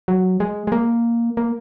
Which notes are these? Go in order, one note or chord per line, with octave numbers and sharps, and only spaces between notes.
F#3
G#3
G#3
A#3
A#3